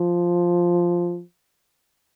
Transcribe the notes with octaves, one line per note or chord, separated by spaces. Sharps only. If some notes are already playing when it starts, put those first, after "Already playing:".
Already playing: F3